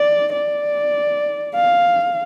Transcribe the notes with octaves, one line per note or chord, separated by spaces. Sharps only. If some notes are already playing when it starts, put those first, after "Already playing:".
Already playing: D5
D5
F5